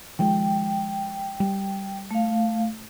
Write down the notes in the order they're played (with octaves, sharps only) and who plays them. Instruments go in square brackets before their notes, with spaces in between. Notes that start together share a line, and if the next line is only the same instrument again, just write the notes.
[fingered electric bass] D#3 F3 G#3 [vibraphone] G5
[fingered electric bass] G3
[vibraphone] A3 F5